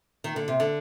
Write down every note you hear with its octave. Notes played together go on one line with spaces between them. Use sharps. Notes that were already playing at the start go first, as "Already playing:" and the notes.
D#3
D3
C3
D3